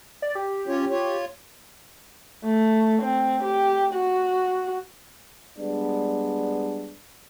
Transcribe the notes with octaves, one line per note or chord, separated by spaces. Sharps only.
D5
G4
C#4 F4 C#5
F4 C#5
A3
C4
G4
F#4
G3 G#3 B3 D4